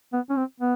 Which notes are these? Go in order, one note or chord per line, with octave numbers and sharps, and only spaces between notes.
B3
C#4
C4
B3